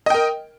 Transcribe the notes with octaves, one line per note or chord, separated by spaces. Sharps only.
A#4 D#5 G5